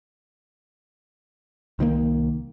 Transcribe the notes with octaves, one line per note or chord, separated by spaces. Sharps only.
C2 D#3 E3 A#3